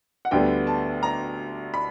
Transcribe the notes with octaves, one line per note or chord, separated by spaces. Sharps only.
F#5
D2 D3 G3 B3 G5
A5
A#5
B5